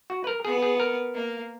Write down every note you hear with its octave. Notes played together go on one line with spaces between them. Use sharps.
F#4
B4
A#4
B3 G#4
G#4
A#4
A#3